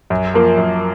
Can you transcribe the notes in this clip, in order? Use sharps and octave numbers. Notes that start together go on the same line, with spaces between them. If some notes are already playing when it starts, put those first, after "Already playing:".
F#2
F3 A#3
F#2